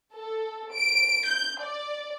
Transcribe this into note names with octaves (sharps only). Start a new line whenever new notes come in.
A4
D7
G6
D5